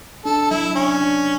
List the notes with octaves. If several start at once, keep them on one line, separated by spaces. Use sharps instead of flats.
D4 A4
F#3 E4
C#4 D4
D4